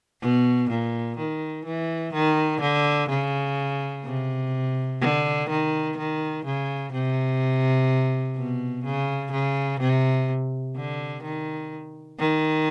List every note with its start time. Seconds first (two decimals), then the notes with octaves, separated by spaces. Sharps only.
0.21 B2
0.70 A#2
1.18 D#3
1.65 E3
2.13 D#3
2.61 D3
3.10 C#3
4.05 C3
5.00 D3
5.49 D#3
5.97 D#3
6.45 C#3
6.92 C3
8.36 B2
8.84 C#3
9.32 C#3
9.80 C3
10.76 D3
11.23 D#3
12.19 D#3